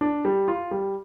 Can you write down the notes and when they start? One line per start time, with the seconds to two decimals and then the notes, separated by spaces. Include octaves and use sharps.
0.01 D4
0.25 G3
0.48 F4
0.71 G3